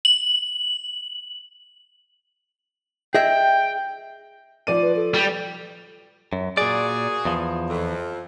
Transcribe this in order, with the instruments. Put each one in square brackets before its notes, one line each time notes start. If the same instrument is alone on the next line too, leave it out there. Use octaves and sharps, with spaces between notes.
[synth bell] F#7
[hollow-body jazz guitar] G#4 D#5 E5 [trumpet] G5
[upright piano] F3 D5 D#7
[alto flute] B4
A4
[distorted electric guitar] G3
[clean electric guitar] F#2
[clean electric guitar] A#2 D5 [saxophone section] F#4 G#4
[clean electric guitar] E2 F3
[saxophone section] F2